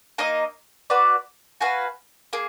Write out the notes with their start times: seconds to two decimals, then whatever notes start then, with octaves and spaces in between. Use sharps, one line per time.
0.18 A#3 D#4 A#4 D#5
0.90 F#4 B4 D5
1.61 F#4 B4 F5 G#5
2.33 A#3 G#4